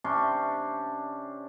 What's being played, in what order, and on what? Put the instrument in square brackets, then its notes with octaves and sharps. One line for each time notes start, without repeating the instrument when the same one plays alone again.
[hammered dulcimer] C3 C#4 D4 C6